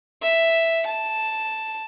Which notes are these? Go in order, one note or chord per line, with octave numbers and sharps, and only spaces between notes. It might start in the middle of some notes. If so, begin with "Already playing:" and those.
E5
A5